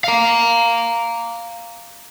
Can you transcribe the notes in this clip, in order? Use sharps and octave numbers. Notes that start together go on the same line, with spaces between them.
F5 A#5